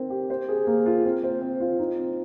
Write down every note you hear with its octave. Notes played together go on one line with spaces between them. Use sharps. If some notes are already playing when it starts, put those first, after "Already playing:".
Already playing: C4 D#4 A#4
G4
C5
G#4
A#3
F4
C4
C5
C4
F4
D#4
C4